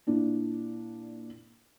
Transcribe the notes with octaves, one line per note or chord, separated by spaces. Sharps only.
A#2 D4 E4